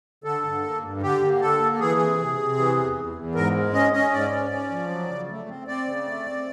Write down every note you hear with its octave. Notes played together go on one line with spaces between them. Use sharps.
D3 A4
G2
A#3
G2
D3 G4
A#3
D3 A4
A#3
E3 G#4
C3
C3
C3
E3
E2
E2
E2
G#2 A#4
G#3
C#4 D#5
C#4 D#5
G#2 D5
C#4
C#4
F3
F#3
C#3
A3
C4
C4 D5
C#3
A3
C4